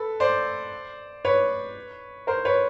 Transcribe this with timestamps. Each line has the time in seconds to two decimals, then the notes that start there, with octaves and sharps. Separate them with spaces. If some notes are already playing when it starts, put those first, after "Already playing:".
Already playing: A4 B4
0.20 C5 D5
1.25 B4 C#5
2.27 A#4 C5
2.45 B4 C#5